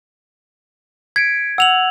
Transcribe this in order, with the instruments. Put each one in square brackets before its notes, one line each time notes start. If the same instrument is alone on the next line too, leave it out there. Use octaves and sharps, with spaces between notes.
[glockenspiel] G#6 [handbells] B6 C#7 D7
[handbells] F#5 [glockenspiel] E6 F7 F#7